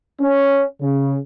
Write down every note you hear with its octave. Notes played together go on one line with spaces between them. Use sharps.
C#4
C#3